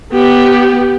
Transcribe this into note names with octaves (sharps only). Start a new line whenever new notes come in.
B3 G4